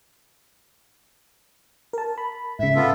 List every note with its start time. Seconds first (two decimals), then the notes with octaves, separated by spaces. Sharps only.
1.93 A#4 A5
2.18 B5
2.59 G#2 C#3 E5
2.75 B3 F4 A4